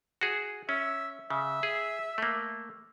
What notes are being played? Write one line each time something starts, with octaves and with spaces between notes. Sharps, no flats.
F#4 G#4
C#4 E5
C#3 E5
G#4
A3 A#3